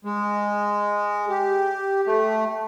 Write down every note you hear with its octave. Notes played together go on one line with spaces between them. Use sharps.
G#3
G4
A3